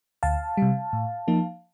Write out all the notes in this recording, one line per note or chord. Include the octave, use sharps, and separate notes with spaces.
D2 F5 A5
C3 G3
A2
F3 A#3 D#4